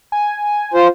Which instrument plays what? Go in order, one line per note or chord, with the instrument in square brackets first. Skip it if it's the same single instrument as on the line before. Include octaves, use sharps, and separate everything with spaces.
[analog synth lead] G#5
[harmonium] F4 C5